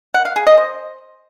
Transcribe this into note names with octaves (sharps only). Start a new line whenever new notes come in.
F#5
F5
G#4
D#5
C5